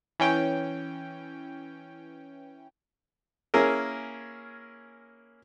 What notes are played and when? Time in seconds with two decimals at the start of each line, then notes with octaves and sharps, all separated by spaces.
0.20 E3 C#4 G5
3.54 A#3 C#4 E4 G#4 A#4